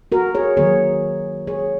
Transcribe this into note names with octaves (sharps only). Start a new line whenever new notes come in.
F#4 A#4
G#4 C#5
D#3 F#3 A#3 G#4 C#5
G#4 C#5